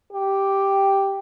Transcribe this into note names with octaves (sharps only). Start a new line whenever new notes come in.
G4